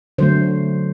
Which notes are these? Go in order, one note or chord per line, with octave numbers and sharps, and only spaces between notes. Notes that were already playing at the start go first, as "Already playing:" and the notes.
D3 F#3 A3 C5